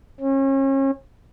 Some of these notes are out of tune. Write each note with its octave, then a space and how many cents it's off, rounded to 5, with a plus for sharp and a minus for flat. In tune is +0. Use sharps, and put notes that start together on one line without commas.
C#4 -35